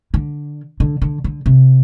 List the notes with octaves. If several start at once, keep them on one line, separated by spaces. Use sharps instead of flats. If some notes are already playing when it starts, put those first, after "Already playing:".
D3
D3
D3
D3
C3